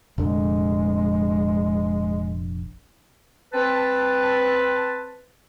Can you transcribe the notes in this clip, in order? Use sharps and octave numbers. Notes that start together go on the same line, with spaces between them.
F1 A#1 D3 G#3
C4 B4 A5